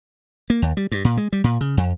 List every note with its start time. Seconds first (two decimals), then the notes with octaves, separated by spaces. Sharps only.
0.50 A#3
0.62 D#2
0.77 G3
0.92 G2
1.05 A#2
1.17 G#3
1.33 G3
1.44 A#2
1.61 C#3
1.77 F2